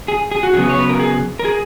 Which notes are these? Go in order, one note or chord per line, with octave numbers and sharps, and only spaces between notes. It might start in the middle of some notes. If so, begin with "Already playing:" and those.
G#4
G#4
F#4
C#3 F#3 B3 G#4
C#5
B4
A#4
G#4
A#4
G#4